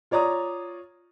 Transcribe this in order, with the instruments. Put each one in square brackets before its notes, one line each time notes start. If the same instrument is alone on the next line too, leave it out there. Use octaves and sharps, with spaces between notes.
[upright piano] F4 C#5 D5 A#5 D#6